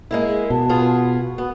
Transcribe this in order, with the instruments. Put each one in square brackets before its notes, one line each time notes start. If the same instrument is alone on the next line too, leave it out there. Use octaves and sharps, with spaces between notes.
[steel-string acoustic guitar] G#3 A#3 E4
[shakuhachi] G#4
[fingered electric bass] B2 [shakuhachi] A5
[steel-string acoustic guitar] B3 F4 G#4
[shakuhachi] F#4
[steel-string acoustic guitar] B3